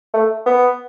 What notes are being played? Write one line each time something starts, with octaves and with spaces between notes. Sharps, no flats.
A3
B3